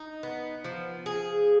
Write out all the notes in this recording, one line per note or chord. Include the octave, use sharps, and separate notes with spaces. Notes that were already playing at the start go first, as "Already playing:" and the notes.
Already playing: D#4
B3
F3
G#4